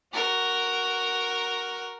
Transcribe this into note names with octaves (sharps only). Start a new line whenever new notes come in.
F#4 A#4